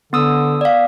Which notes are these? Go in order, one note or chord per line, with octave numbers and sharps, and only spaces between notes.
D3 B3 D#6 E6
D5 F5